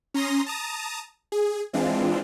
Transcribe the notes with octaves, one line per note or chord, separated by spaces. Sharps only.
C#4 A#5 C6 D#6 A#6
A5 A#5 D#6
G#4
E3 G#3 C4 D4 F4